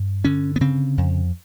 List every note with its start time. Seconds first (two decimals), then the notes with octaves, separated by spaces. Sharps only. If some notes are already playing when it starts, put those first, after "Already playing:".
Already playing: G2
0.24 D3 C#4
0.56 B3
0.61 C#3 C4
0.98 F2